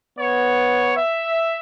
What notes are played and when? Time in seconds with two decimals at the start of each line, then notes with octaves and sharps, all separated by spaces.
0.19 B3 C#5
0.97 E5